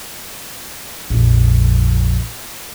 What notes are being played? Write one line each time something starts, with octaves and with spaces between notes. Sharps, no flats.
A#1 F2